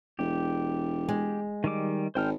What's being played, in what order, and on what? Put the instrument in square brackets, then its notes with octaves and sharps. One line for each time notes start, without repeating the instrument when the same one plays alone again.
[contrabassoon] E1 [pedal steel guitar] G4
[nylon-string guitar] G#3
[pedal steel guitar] D#3 G3 D6
[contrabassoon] G#1 [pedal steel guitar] C5 G5 F6